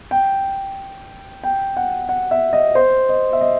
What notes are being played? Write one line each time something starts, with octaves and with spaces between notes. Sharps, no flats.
G5
G5
F#5
F#5
E5
D#5
C5
D#5
E5
D#5